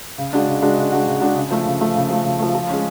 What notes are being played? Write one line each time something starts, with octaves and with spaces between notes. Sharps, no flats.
C#3
G#3 D4 F#4
C#3
G#3 D4 F#4
C#3
G#3 D4 F#4
C#3
G#3 D4 F#4
C#3
F3 A3
C#3
F3 A3
C#3
F3 A3
C#3
F3 A3
F3
G#3 C#4